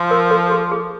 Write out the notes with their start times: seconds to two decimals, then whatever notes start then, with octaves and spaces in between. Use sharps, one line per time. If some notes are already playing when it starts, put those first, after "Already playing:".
Already playing: F3
0.11 A#4
0.31 A4
0.51 G#4
0.72 G#4